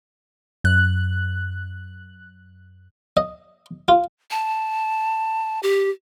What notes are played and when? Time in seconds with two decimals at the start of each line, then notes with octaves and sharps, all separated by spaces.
0.64 F#2 F#6
3.17 D#5
3.88 F4
4.31 A5
5.63 G4